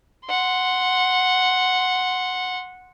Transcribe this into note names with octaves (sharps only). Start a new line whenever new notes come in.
F#5 C6